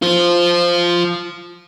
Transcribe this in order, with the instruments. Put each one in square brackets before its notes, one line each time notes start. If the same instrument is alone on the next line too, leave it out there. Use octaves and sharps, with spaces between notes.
[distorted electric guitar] F4 C5